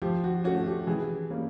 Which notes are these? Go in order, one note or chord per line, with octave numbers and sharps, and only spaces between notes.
F3 G4
F#4
A3 C#4 F#4
G4
E3 G#4
G3 A#3 C#4